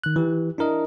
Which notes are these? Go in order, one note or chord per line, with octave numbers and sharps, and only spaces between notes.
D#3 F#6
E3 G4
D4 E4 A#4 D#5